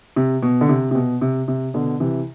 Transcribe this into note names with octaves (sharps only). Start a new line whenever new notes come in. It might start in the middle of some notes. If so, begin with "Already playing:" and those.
C3
B2
D3
C3
C3
B2
C3
C3
B2 D3
C3 E3